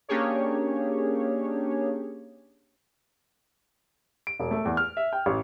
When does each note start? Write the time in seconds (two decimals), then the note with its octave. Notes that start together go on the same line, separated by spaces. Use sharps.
0.08 A#3 C#4 D4 G4 G#4 C#5
4.27 D7
4.40 E1
4.51 A3
4.65 E2
4.77 F6
4.97 E5
5.13 G5
5.26 A1